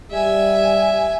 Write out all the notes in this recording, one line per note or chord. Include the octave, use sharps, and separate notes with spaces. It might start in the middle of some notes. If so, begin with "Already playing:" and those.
G3 E5 G#5